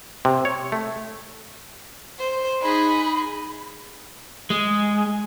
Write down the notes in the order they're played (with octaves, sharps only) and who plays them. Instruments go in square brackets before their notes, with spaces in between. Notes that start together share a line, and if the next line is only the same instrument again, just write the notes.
[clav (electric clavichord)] C3
C#5
A3
[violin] C5
[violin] D#4 G#4 [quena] B5
[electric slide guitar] G#3